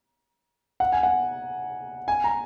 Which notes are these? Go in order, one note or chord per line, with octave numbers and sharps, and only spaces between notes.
F#5
G#5
F#5
G#5
A#5